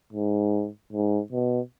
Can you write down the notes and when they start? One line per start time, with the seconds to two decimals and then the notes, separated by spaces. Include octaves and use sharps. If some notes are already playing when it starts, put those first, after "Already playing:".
0.13 G#2
0.93 G#2
1.32 B2